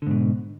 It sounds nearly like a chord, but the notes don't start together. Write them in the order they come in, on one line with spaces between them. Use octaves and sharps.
D3 G#2 B2